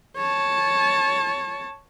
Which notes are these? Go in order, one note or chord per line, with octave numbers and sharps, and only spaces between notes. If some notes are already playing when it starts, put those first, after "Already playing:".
C#5 A5